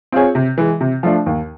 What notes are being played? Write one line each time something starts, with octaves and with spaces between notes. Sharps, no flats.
C4 F4 G#4 C#5
C3
E3 G#3
C3
F3 A3 D4
D#2